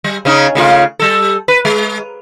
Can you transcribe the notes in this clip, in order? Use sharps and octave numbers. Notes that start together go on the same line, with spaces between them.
G3
C#3 C#4 D#4
C#3 A3 F4
G3 A4
B4
G#3